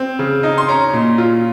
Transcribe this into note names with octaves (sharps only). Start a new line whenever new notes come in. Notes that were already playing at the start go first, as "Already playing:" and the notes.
Already playing: C4
C#3
D#4
C6
C#4 A#5
A#2
F4